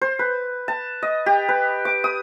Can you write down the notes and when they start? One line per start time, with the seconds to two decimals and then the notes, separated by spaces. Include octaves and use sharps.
0.01 C5
0.19 B4
0.68 A5
1.02 D#5
1.26 G4
1.49 B4
1.85 D6
2.04 D#6